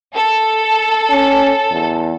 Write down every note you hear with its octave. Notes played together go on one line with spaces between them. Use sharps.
A4
C#4
E2